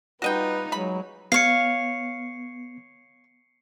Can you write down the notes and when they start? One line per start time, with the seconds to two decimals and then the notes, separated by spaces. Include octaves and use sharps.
0.22 G3 D#4 F4 F#4 B4 D#5 G5
0.72 F#3 G#3 B5
1.32 B3 C#5 F5 C7 C#7